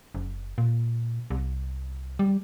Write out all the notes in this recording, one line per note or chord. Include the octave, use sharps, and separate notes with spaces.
F#1
A#2
C2
G3